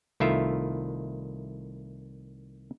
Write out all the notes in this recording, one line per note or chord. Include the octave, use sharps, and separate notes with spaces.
C2 D#3 A3 E4 F4 E5